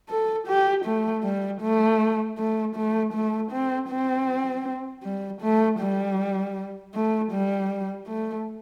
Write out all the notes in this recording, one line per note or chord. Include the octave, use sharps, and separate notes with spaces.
A4
G4
A3
G3
A3
A3
A3
A3
C4
C4
G3
A3
G3
A3
G3
A3